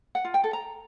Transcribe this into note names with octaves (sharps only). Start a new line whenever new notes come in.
F#5
F4
G5
A4
A#5